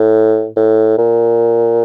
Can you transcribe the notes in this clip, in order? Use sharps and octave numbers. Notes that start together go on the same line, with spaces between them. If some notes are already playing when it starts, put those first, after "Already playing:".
Already playing: A2
A2
A#2